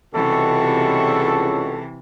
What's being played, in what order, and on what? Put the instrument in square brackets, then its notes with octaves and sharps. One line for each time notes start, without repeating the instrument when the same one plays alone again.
[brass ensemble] C#2 [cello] C3 E3 [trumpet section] G3 F#4 C#6 [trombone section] A4